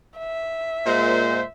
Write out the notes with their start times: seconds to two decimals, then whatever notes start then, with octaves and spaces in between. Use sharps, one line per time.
0.18 E5
0.87 A#2 G#3 C5